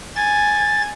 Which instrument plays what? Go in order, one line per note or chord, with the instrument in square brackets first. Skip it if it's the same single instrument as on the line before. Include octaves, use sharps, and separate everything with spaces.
[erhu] G#5 [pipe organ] A6